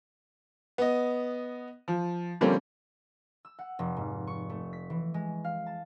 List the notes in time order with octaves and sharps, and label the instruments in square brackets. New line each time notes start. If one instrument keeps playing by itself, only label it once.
[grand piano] B3 D#5
F3
D3 F3 G3 A#3 C4 C#4
[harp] E6
F#5
F1
G#2
C#6
A3
B6
E3
G#3
F5
A5